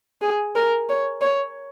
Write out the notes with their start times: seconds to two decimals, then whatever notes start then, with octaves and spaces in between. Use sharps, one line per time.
0.21 G#4
0.55 A#4
0.89 C#5
1.21 C#5